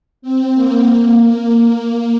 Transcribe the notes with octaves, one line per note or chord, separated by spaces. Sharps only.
C4
A#3
A#3